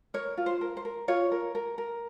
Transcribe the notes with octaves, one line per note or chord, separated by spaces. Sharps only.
A#4 C#5
F4
C5
A#4
C5
A#4
F4 C#5
A#4
A#4
A#4